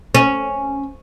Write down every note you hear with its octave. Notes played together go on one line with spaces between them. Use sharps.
C#4